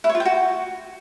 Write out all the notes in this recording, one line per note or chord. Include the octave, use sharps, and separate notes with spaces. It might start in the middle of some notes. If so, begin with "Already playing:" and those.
E4
C#5
F4
G5
F#4